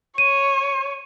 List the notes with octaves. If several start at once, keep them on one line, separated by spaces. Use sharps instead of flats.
C#5 D#7